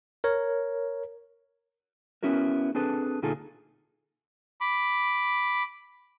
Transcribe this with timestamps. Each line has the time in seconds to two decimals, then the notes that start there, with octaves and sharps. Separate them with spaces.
0.24 A#4 C#5
2.23 B3 C#4 E4 F#4 A#4
2.75 C4 D4 G#4 A4 B4 A5
3.22 D2 A#2 D#4 F4 G#4 A4
4.61 B5 D6